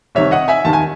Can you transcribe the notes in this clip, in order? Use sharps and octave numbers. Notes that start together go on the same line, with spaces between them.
C2 C3 D#3 C#5 E5
D#5 F#5
E5 G#5
D#2 D#3 A5
G#5